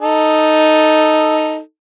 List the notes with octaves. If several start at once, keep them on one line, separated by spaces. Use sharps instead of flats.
D#4 A4